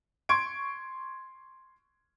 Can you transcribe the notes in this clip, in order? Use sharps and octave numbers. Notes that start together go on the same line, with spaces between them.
C6 C#6 G#6 D7